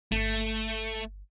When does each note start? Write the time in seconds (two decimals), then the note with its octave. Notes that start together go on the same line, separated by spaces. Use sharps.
0.12 G1 A3